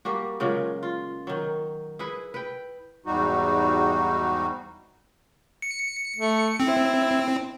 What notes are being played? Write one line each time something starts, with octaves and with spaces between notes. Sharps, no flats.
G3 A#3 F#4
A#2 C#3 F#3 G#3
F4
D#3 F#3
E4 G#4 B4
B4 G5
E2 G#2 G3 D#4 F#4
C#7
A3
C4 E4